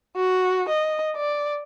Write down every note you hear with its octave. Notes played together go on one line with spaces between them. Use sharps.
F#4
D#5
D5